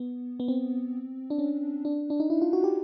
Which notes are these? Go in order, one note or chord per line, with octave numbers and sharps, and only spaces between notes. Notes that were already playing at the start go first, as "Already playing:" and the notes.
Already playing: B3
B3
C4
D4
C#4
D4
D4
D#4
E4
F4
F#4
G4